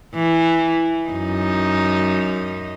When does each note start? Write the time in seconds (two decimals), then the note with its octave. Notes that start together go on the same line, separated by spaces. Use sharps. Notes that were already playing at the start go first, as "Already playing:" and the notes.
0.14 E3
1.08 F#2 D#4